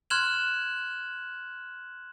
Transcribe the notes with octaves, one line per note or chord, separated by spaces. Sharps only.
C6 F6 F#6 G#6 E7 F#7